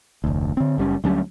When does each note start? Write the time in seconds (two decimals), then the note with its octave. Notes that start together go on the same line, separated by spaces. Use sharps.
0.24 F1 D2
0.57 D3 C4
0.78 F#1 G3 C#4
1.04 D2 F#3 G3 C#4